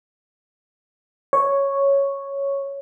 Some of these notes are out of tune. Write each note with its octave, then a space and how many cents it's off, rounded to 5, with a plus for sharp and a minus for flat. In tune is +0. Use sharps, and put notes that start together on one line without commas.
C#5 +0